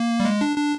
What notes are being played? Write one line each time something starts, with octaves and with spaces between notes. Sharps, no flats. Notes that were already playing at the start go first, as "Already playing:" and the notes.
Already playing: A#3
G3
G#3
D4
D4